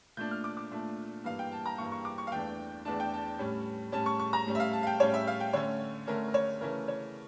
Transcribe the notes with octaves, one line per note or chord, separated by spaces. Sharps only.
A#2 A3 D4 G6
F6
D6
D6
A#2 A3 D4
G2 E3 A#3 F5
G5
A5
A#5
G2 E3 A#3 C#6
C#6
D6
C#6
F5
E2 E3 A3 D4 G5
E2 E3 A3 D4 A5
G5
A5
A2 G3 C#4
A2 G3 C#4 A5
C#6
C#6
A#5
A2 G3 C#4
E5
F5
A5
F5
G5
A2 G3 C#4 C#5
E5
F5
G5
D3 A3 C#4 C#5
D3 A3 C#4 A#4
A#4
C#5
C#3 E3 A3 C#4 A#4
C#5